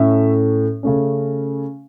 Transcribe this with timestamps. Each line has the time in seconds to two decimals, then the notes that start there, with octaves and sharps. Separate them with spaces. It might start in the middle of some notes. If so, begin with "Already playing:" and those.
Already playing: A2 A3 C#4 E5
0.83 C#3 A3 C#4